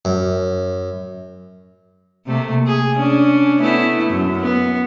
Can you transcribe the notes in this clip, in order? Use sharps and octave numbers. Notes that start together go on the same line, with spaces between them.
F#2
C3 A3 A#3
G#4
C#4 D4
A3 B3 E4
F#2
B3